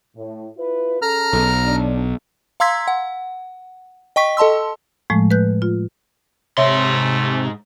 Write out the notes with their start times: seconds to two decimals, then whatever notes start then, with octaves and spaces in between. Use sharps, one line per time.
0.17 A2
0.57 E4 F4 B4
1.02 C#4 G#4 A4 A#5 F6
1.33 B1
1.66 D4
2.60 F5 A#5 C6 E6 G#6 B6
2.88 F#5
4.16 D#5 G5 C#6 B6
4.37 A4 D#5 A5 C6 E6
5.10 A2 F3 G#3 A3
5.31 B4 F#6 G6
5.62 F4
6.57 G#2 C3 A3 C#5 E5 C6